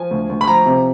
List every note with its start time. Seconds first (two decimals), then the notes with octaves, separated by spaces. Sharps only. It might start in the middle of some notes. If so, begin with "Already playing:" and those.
Already playing: F3 G#5
0.11 D2
0.29 D2
0.41 B5
0.47 F3 A#5
0.66 C3